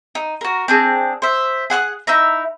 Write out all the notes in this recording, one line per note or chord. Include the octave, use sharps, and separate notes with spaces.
D#4
F#4 A#4
C4 D4 G#4
C5 E5
G#4 F#5 E6 F#6
D#4 E4 E5 A#5